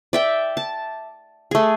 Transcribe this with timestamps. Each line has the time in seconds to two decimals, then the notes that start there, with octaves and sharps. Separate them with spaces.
0.13 D5 E5 G5
0.57 A5
1.51 A3 G#4